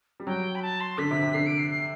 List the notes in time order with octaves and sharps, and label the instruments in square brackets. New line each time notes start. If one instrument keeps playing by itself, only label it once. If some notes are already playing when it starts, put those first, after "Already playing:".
[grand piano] G3
[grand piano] F#3 [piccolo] G5
[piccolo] B5
A5
C6
[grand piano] D3 [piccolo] B6
[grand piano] C3
C3
[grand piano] D3 [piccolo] C7
[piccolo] D7
C7
C7